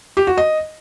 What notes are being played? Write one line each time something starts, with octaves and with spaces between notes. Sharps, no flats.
G4
F#4
D#5